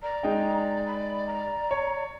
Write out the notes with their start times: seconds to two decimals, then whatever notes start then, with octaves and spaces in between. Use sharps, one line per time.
0.03 D5 A#5
0.23 G#3 D#4 G5
0.87 B5
1.27 A#5
1.71 C#5